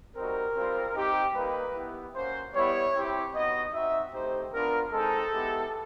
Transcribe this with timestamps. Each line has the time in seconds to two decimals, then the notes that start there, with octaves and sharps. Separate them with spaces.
0.16 G3 C4 D#4 F#4 A#4
0.55 G3 C4 F4
0.95 C4 D#4 G4
1.35 G3 A#3 D#4 B4
1.75 B3 E4 G4
2.14 A#3 C#4 F#4 C5
2.54 G3 B3 E4 G4 C#5
2.94 C4 E4 G4
3.34 B3 D#4 F#4 D#5
3.74 C4 D#4 F#4 E5
4.13 A3 C4 D#4 G4 C5
4.52 B3 D4 F4 A#4
4.92 G#3 C4 D#4 A4
5.32 G#3 B3 E4 G4